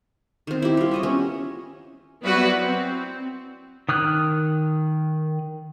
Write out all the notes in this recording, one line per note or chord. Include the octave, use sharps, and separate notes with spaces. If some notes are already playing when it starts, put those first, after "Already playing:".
D#3 C4
E4 G4
G3 F4
C#5 D#5 E5
B3 C#4
F#3 B3 E4 F#4 B4 D5
C4
D#3 D#6 F6 F#6